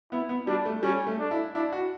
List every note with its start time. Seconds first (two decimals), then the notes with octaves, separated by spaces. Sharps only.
0.12 B3 E4
0.29 B3
0.47 G3 D4
0.65 A3
0.83 G3 C#4
1.07 A3
1.19 D4
1.31 E4
1.55 D4 E4
1.72 F#4